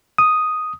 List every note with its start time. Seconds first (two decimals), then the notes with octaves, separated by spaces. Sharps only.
0.18 D#6